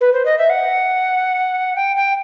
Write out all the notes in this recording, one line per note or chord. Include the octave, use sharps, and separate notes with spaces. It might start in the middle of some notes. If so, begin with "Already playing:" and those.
B4
C5
D#5
E5
F#5
G5
G5